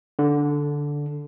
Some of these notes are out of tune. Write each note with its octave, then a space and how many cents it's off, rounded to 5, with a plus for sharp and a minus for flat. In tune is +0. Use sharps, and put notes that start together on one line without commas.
D3 -5